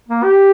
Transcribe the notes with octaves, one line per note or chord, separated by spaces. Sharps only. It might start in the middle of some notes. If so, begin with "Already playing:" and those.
A#3
G4